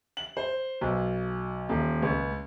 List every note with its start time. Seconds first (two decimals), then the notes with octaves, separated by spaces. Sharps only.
0.17 F#7
0.37 C5
0.81 B1
1.69 D#1
2.02 C#2